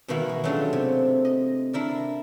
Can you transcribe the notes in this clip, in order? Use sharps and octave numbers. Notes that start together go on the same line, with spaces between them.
B2 D#3 E3 A#3 E4 F#4
G#4
F#3 G#3 A3 C#4 D4 F4
C3
D#5
D4 E4 A#4 D5